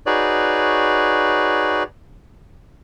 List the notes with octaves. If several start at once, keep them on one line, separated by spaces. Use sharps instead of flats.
D#4 F#4 G#4 B4 C#5 D5